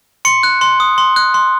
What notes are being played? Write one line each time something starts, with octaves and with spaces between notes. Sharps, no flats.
C6 C#7
F#6
C6
D#6
C6
F#6
C6